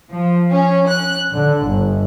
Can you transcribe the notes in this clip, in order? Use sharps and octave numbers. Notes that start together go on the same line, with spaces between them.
F3
C#4
F#6
D3
G1